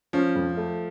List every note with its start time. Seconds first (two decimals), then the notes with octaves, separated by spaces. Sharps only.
0.13 F3 C#4
0.35 F2
0.57 A3